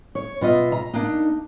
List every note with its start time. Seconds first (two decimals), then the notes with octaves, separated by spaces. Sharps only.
0.15 C#5
0.41 B2 F4 D#5 E5
0.72 A#5
0.93 A#3 D4 D#4